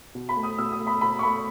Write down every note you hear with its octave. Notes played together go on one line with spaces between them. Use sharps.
B2
B5
A3
D#6
B2 E6
D#6
A3
B5
B2 B5
C#6
A3 B5